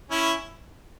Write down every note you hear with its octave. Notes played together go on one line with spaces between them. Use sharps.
C#4 E4